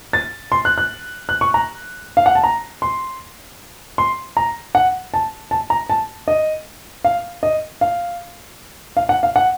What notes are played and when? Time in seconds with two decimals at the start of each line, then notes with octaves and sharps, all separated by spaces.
0.13 A6
0.52 C6
0.65 F#6
0.78 F#6
1.29 F#6
1.41 C#6
1.54 A#5
2.17 F5
2.26 F#5
2.35 A5
2.44 A#5
2.82 C6
3.98 C6
4.37 A#5
4.75 F#5
5.14 A5
5.51 A5
5.70 A#5
5.90 A5
6.28 D#5
7.05 F5
7.43 D#5
7.81 F5
8.97 F5
9.09 F#5
9.23 F5
9.36 F#5